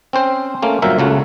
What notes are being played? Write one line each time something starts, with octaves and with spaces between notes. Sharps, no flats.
C4 C#4 C5
A3 A#3 C#4
G1 A#2 F#3 A#4 C5 E5
C#2 C#3 A3 F#4